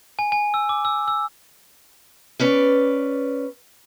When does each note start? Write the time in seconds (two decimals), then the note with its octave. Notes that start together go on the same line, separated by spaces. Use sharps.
0.19 G#5
0.32 G#5
0.54 E6
0.69 D6
0.85 E6
1.08 E6
2.39 C#4 B4 D5